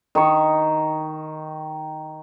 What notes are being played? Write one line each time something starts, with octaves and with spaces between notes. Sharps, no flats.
D#3 C#6